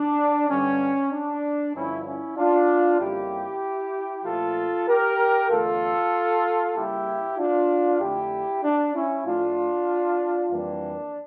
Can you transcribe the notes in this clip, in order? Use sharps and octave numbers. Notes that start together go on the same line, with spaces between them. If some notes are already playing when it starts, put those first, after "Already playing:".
Already playing: D4
G2 D3 G3 C#4
D4
G2 D3 F3 C#4 E4
C#4 E4
D4 F4
F2 C#3 G3 A#3 E4 G4
A#2 F3 A3 F4 A4
G4 A#4
E2 D3 A3 F4 A4
C#3 G3 A#3 E4 G4
D4 F4
F2 D3 A3 E4 G4
D4
C#4 E4
A2 F3 A3 D4 F4
F2 E3 G3 A#3 D4